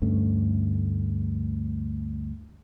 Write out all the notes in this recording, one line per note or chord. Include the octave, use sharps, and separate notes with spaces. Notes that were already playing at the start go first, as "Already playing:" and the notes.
D2 G2 A3 C#4